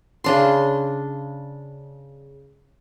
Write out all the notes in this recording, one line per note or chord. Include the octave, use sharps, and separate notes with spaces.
C#3 D4 C6